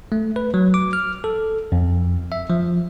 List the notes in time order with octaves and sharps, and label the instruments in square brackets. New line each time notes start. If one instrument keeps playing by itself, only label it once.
[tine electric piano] A3
B4
F#3
D6
F6
A4
F2
E5
F3